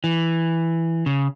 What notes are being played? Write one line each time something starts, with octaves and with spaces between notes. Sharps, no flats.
E3
C#3